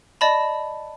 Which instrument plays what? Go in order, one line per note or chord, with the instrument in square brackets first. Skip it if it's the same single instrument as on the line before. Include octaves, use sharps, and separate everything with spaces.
[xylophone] D5 D#5 A5 B5